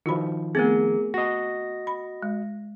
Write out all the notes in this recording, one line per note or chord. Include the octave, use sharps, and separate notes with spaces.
D#3 F3 F4 F#4 B5
A3 B3 C4 G#4 A#4
F#4 D#5 A#6
B5
G#3